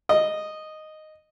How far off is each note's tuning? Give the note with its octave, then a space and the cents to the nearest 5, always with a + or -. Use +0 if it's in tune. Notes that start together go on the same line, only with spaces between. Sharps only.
D#5 -5